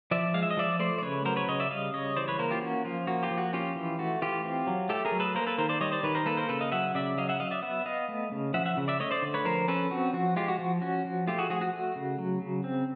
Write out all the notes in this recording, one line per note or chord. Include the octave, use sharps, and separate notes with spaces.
F3 D5 E5
G#3 F5
E5
D#5
F3 D5 E5
A3 C5 D5
D5
C#3 B4 C#5
F#3 A#4 C5
B4 C#5
C#3 C#5 D#5
D5 E5
G3 D#5 F5
C#3 C#5 D#5
E3 C5 D5
B4 C#5
A#3 A#4 C5
F4 G4
C#4 F#4
F3 F4
A#3 F#4
F4 G4
F3
F#4
C#4 F4 G4
E3
A3 F#4
E3 F4 G4
C4
F#3
A3 G4 A4
G#4 A#4
F#3
A4 B4
A#3 A#4 C5
A4 B4
D#3 A#4 C5
C5 D5
G3 C#5 D#5
C5 D5
D#3 B4 C#5
A#4 C5
A#3 A4 B4
A#4 C5
C#3 A4 B4
D#5 F5
F#3 E5 F#5
C#3 D5 E5
F#3 D#5 F5
E5 F#5
F#3 D#5 F5
D5 E5
B3 E5 F#5
B3 D#5 F5
A3
C#3
F3 E5 F#5
E5 F#5
C#3
D5 E5
A3 C#5 D#5
C5 D5
D3
B4 C#5
F3 A#4 C5
C#4 A4 B4
C4 F#4
F3 F#4
G#3 F4 G4
F#4
F3 F#4
C#4 F#4
F3
A3 F4 G4
F#4 G#4
F3 F#4 G#4
F#4
A3
C#3
F#3
C#3
C4